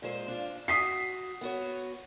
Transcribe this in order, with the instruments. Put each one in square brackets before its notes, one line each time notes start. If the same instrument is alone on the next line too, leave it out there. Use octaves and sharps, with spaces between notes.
[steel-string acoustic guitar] A#2 G#3 C5
D4 F4
[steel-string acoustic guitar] F#4 [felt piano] D#6 B6 C7
[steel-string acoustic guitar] B3 F#4 C#5